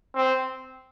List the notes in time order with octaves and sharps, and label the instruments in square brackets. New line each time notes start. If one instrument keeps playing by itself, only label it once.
[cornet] C4